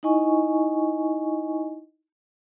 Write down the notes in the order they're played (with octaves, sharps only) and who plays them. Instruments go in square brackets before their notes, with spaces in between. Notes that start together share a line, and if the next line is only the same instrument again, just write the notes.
[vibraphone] D#4 E4 D#5 G#5 C#6